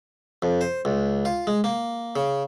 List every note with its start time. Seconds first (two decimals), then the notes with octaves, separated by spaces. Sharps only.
0.42 F2
0.61 C5
0.85 C#2
1.25 F4
1.47 G#3
1.64 A#3
2.16 C#3